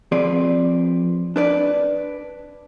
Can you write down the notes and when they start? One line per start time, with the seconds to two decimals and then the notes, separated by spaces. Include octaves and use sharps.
0.12 F3 C4 G#4 B4 D5
1.36 D4 B4 D5